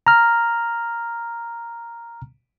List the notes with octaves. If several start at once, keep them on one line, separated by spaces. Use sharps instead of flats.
A#5 F6